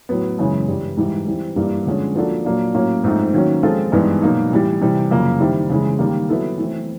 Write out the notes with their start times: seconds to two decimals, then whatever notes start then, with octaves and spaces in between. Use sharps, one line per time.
0.09 A2 F#3 B3
0.38 F#2 C#3 E3 G#3 C#4
0.68 G2 E3 G3
0.97 G#2 E3 G3
1.27 E3 G3 C4
1.56 G2 E3 G3 A#3
1.86 D3 F3 G#3 C#4
2.15 F3 A#3 D4 F#4 A4
2.45 A#2 F#3 A#3 D4
2.74 A2 F#3 A#3 C#4
3.04 G#2 F3 A3 C4 D#4
3.34 D#3 F#3 A#3 C#4
3.63 F3 G#3 C4 F4 A4
3.92 G2 E3 G#3 B3 D#4
4.22 B2 F#3 A#3 D#4
4.51 A2 E3 G3
4.81 C3 E3 G3
5.11 F#2 C#3 F3 A#3
5.40 D#3 G3 C4 E4
5.69 C#3 E3 G#3
5.99 D#3 G3 A#3
6.29 F#3 B3 E4 A4
6.58 E3 A3 C4